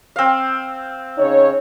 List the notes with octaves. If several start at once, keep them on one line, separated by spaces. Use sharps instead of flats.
C4 F5
C#3 D#4 C#5